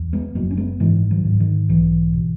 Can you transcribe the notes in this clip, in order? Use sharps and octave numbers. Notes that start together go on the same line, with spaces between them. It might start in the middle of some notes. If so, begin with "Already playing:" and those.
Already playing: E2
G#3 B3
F#1 F#3 A#3
C#4
G#3 B3
G#2 E3 G#3
D#3 F#3
G#2
D#3
B1 E3
B2